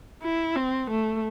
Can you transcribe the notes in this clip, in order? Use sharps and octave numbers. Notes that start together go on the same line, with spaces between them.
E4
C4
A3